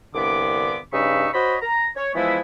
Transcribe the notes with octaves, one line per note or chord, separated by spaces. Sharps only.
C2 G2 D3 B3 D6
G2 C#3 D#4 B5 C#6 E6
F#4 C5 C#5 D#5 B5
A#5
C#5
E3 F3 G#3 B3 E4